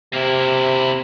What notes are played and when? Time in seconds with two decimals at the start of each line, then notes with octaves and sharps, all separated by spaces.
0.13 C3 A#3 E4